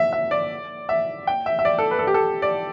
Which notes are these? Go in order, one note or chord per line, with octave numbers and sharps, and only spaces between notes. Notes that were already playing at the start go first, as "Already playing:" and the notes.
Already playing: E5
E5
D5
E5
G5
E5
E5
D5
A4
B4
A4
G4
A4
D5